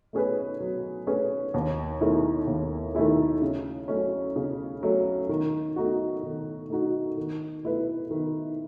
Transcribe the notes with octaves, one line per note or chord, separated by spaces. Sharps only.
A3 C#4 G#4 B4
F#3
A3 C#4 G#4 B4
D#2
D#3 A3 E4 G#4
D#2
D#3 A3 E4 G#4
C#3
F#3 A3 C#4
C#3
F#3 A3 C#4
D#3
A3 D#4 F#4
D#3
A3 D#4 F#4
D#3
A3 E4 B4
D#3